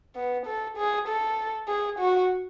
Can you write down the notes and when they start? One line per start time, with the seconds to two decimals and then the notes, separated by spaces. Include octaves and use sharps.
0.16 B3
0.46 A4
0.77 G#4
1.08 A4
1.68 G#4
1.99 F#4